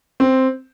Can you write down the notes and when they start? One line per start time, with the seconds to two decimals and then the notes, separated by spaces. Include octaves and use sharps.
0.20 C4